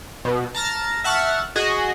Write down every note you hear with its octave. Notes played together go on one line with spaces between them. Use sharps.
B2
A5 A#5 F6 A6
E5 F#5 A5 C#6 F6
F#4 G#4 D#5